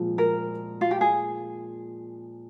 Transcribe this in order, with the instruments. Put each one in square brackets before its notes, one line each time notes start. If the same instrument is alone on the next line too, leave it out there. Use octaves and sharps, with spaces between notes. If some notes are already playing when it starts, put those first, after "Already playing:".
Already playing: [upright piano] A#2 F3 G#3
[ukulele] A#4
F4
G4
G#4